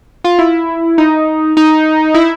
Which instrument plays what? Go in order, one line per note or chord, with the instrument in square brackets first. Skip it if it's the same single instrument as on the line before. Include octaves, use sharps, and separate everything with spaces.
[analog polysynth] F4
E4
D#4
D#4
E4